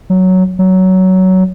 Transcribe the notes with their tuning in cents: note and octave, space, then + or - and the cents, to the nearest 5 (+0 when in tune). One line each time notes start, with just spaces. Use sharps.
F#3 +5
F#3 +15